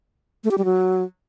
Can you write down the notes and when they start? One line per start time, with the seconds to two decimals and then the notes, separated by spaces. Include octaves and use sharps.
0.44 A3
0.51 G4
0.58 G3
0.65 F#3